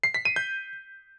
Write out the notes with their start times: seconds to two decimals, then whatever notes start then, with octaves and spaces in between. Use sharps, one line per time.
0.04 C7
0.14 B6
0.25 D#7
0.36 G6